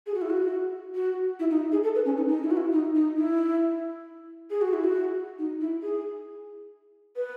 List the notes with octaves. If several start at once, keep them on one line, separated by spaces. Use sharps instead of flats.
G#4
F#4
E4
F#4
F#4
E4
D#4
G#4
A4
B4
C#4
D#4
D#4
E4
F#4
E4
D#4
D#4
E4
G#4
F#4
E4
F#4
D#4
E4
G#4
B4